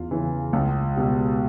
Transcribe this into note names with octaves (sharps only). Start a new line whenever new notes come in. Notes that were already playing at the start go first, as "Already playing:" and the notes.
Already playing: E2 F4
C#3 E3
C#2
B2 G3